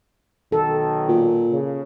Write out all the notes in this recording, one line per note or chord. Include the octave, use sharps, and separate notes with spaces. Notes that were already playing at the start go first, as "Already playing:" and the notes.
B1 D#3 F#3 A4
A#2
C#3